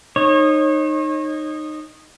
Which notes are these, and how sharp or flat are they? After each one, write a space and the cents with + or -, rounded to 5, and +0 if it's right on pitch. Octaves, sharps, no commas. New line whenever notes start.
D#4 -15 C#5 -35